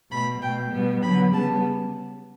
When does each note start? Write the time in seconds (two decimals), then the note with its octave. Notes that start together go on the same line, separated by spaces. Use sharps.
0.10 B2 A3 B5
0.41 B2 A3 G5
0.72 B2 G3 B3
1.02 D3 F#3 B3 B5
1.33 C#3 G3 B3 A5